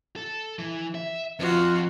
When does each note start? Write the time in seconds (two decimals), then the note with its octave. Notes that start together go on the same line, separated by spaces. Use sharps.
0.16 A4
0.59 E3
0.95 E5
1.39 F2 F4 F#4